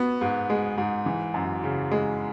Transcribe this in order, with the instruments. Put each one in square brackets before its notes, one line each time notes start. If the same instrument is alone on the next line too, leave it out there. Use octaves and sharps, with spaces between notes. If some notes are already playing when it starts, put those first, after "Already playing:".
Already playing: [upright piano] B3 F#4
G#2
G#3
G#2
E3
F#2
C#3
G#3